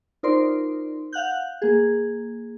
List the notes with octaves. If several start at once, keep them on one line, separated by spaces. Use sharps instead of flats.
D#4 F4 A#4 C5 D5 C6
F5 F#5 F#6 G6
A#3 G#4